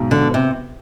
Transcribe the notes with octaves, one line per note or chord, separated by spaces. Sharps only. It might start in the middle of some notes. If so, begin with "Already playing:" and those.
Already playing: B1 G#2
D3
B3
C3